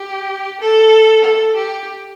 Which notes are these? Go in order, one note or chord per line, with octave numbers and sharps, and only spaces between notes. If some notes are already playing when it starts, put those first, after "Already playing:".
Already playing: G4
A4
A4
G4